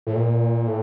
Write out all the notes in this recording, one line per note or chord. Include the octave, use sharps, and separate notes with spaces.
A2
A#2
A2